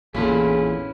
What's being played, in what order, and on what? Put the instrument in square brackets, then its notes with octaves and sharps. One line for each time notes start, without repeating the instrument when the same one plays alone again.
[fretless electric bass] A1 E2 [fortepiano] A#2 D3 [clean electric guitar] C#4 E4 B4 [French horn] G#4